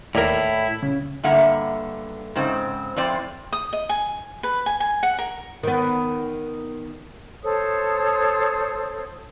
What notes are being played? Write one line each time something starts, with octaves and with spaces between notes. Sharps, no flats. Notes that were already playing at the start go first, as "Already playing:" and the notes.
D#2 A2 E4 A#4 D5
C#3
G2 D3 A#3 E5 F#5 A#5
G#2 C#3 C4
F2 A2 C4 C5 D5
D#6
D#5
G#5
B4
G#5
G#5
F#5
A#4
D#3 B3
A4 C5 C#5 D#6